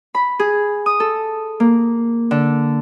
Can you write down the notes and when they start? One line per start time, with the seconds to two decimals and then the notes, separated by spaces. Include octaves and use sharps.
0.15 B5
0.39 G#4
0.86 D#6
1.00 A4
1.60 A#3
2.31 D3